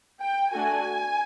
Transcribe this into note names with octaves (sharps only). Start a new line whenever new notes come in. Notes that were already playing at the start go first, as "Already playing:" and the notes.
G5
A3 D4 F#4 A4 G#5